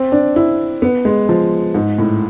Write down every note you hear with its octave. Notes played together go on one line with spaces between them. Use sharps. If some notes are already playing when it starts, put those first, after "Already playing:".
Already playing: C4
D4
E4
B3
G#3
F3
G#2
A2